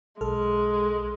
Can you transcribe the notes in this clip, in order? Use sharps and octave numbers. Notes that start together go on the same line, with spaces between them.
B1 G#3 A4 F6